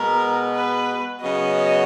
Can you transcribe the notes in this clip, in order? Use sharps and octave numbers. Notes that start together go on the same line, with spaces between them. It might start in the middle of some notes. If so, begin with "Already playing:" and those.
Already playing: B2 G#3 B3 F#4 A#4
B4
C#3 F#3 B3 F#4 D#5